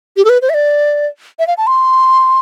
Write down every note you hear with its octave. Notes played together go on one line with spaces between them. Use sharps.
G4
A4
B4
C5
E5
D5
E5
F5
A5
C6